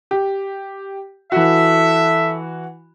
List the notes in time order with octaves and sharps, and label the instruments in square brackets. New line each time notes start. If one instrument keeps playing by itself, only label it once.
[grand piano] G4
[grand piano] E3 F#4 [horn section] A4 E5